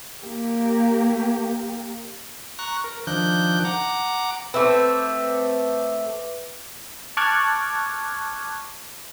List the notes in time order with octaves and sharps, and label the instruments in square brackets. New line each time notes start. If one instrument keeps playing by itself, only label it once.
[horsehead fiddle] A#3 G4
[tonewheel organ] A#5 C#6 F#6
A#4
D#3 F3 D4 F#6 G6
F#5 A#5 D6
[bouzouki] A3 C4 [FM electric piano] B4 E5 D6
[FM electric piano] A5 C#6 D6 F6 F#6 G#6